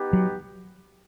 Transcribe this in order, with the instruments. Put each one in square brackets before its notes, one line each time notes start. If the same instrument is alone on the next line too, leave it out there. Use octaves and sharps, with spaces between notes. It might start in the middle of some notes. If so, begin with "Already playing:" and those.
Already playing: [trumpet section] B3 D#4 G4
[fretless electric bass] F#3